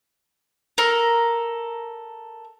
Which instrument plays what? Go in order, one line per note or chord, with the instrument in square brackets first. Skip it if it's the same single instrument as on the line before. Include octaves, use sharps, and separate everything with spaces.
[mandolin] A4 A#4